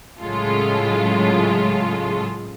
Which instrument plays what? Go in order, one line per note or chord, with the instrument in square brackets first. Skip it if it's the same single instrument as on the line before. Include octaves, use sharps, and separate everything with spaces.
[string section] A2 C#3 F#3 G#3 F4 A4